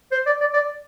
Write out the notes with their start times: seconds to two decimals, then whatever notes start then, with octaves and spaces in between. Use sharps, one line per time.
0.12 C5
0.26 D5
0.41 D5
0.54 D5